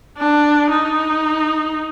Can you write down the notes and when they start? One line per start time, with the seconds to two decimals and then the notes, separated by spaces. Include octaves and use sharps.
0.18 D4
0.70 D#4